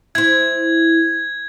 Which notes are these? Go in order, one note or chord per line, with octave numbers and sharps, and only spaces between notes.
E4 C5 G#6